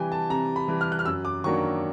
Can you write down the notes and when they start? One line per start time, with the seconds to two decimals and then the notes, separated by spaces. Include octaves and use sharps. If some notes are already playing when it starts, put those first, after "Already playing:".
Already playing: C3 E3 G3 G5 G#5
0.12 A5
0.30 C3 A#5
0.56 B5
0.68 E3 G3
0.81 F6
0.92 F#6
0.99 F6
1.06 F#2 E6
1.25 D6
1.44 D#3 F#3 A#3 D4 C#6